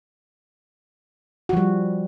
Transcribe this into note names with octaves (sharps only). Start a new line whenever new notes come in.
F3 G3 F#4